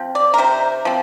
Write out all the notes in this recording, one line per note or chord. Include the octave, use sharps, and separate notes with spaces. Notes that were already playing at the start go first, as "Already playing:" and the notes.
Already playing: F3 C4
D5
A#4
C3 C5
F3 C4